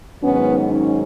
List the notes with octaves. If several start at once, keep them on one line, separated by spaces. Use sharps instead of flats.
G#2 D#3 F#3 B3 C#4
C#4 D#4